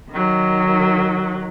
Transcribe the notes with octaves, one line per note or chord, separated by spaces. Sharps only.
D#3 F#3